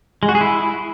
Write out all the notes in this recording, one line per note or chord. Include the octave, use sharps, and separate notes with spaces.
G#3
F#4
G#4
E4